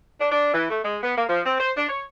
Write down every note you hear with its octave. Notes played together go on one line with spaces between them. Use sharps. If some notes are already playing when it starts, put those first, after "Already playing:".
D4
D4
E3
A3
G#3
B3
A#3
F3
C4
C5
D4
C#5